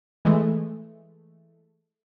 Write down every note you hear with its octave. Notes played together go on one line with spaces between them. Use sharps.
E3 G#3 A3